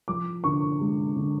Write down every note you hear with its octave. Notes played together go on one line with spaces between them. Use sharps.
F3 D6
D3 C#6
G#3
D3